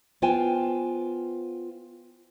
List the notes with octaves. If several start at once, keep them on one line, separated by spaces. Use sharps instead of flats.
B3 F4 C5 G5 G#5